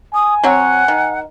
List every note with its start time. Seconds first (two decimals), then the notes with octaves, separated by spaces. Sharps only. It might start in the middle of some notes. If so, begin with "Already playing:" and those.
0.14 G#5 D#6
0.44 F#3 C4 C#5 F#5
0.88 D#3